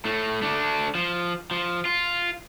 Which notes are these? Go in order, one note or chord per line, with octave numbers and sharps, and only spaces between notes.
A2 A3
A3 D4
F3
F3
F4